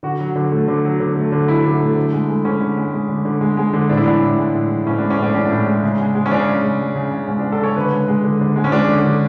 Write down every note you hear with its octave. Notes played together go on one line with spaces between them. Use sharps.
D3 F#4
F#3
D3
A3
D3
F#3
D3
A3
D3
F#3 E4
D3
A3
D3
G#3
G#3
D3 C#4
D3
G#3
G#3
D3
D3
G#3
G#3
D3
A2 D4
E4
E3 D4
A2
G#3
A2
E3
A2 C#4
G#3 D4
C#4
A2 D4
E3 C#4
D4
A2
G#3
C#3
G#3
G#3
C#4
C#3 D4
C#3
G#3
G#3
C#3
C#3
G#3 C#4
D4
G#3
A4
C#3 C#5
D3 B4
G#3
G#3
D3
D3
G#3
C#4
G#3 D4
D3
D3